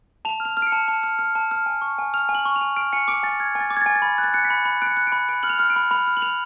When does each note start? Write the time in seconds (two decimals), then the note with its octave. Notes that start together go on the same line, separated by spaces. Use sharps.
0.25 A5 F7
0.40 F6
0.45 F7
0.57 F6
0.62 D7
0.67 C#7
0.72 A5
0.88 A5
1.03 F6
1.19 F6
1.35 A5
1.51 F6
1.66 G#5
1.82 C#6
1.98 G#5
2.14 F6 F7
2.29 G#5
2.35 F#7
2.45 C#6
2.56 F7
2.61 G#5
2.76 F6 D7
2.93 G#5 C#7
3.08 D6 D7
3.23 G#5 A6
3.40 F6 G#6
3.55 G#5
3.60 A6
3.70 D6
3.77 G#6
3.81 G#5 A6
3.95 A6
4.02 B5 G#6
4.18 F#6
4.24 A6
4.34 F#6 C#7
4.45 B6
4.50 B5
4.65 B5
4.82 F#6 D7
4.86 C#7
4.97 F#6
5.07 D7
5.12 B5
5.29 B5 D7
5.43 F6 F#7
5.50 F7
5.59 F6
5.70 D7
5.76 B5
5.91 B5 F7
6.07 F6
6.17 F#7
6.22 F6 F7